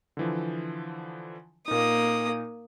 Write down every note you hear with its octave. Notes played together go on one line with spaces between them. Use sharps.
D3 E3 F3
A#2 A#3 D#4 D#6